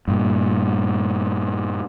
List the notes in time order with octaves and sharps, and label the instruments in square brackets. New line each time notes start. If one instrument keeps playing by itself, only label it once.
[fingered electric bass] G2 A#2